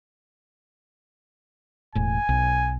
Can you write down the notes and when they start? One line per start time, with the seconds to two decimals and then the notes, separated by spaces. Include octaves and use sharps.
1.95 E1 A2 G#5
2.29 B1